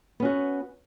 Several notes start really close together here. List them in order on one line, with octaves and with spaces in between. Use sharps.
B3 C#4 F#4